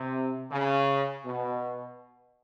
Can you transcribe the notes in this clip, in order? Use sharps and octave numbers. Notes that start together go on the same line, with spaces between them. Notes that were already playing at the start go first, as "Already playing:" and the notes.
Already playing: C3
C#3
B2